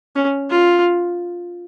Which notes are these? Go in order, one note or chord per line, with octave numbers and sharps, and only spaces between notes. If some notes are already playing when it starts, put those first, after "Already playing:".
C#4
F4